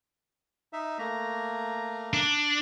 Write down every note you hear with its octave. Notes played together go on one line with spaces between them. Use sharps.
D#4 E5
A3 A#3 A#5
D4